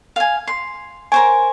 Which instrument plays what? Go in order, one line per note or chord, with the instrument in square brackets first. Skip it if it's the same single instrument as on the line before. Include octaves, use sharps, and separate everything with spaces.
[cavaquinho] F5 G#5
C6
[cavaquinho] A#4 C5 C#5 [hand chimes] G#5